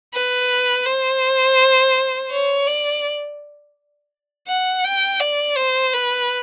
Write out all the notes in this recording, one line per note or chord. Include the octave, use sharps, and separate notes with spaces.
B4
C5
C#5
D5
F#5
G5
D5
C5
B4